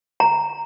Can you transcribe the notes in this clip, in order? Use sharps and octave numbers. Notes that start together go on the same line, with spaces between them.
A#5